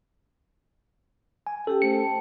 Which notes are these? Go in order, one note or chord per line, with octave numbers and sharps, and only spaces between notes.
G#5
C#4 G4 A4 G5
A3 C5 C#7
G5 A5